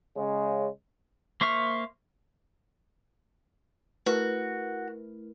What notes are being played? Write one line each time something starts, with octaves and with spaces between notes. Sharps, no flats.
C#3 G#3
A#3 C5 E5 C#6 F6
A3 E4 F#4 A#4 B4